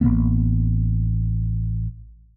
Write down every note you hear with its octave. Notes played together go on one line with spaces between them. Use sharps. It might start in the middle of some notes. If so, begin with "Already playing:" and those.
A1 D3 A#3 B3